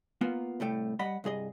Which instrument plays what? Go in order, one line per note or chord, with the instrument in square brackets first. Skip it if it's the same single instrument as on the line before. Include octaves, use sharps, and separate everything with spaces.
[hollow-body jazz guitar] A#3 B3 F4
C2 A2 A3 G5
G3 D#5 F#5 B5
C2 G2 G#4 D#5